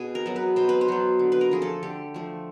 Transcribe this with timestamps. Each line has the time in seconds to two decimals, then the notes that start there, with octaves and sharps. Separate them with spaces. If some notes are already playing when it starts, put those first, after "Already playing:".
Already playing: B2 G#4
0.15 A#4
0.26 F#3 B3
0.36 B4
0.56 B2 C5
0.69 B4
0.81 C5
0.88 F#3 B3
1.19 D3
1.32 B4
1.41 A#4
1.51 F3 A3 G#4
1.62 A4
1.83 D3 G4
2.14 F3 A3